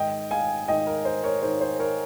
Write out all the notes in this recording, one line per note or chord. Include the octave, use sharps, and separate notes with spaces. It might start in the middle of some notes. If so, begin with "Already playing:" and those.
Already playing: G#2 D#3 D#5 G5
F5 G#5
G#2 D#3 D#5 G5
A#4
C5
A#4 C#5
G#2 D#3 C5
C5
A#4 C#5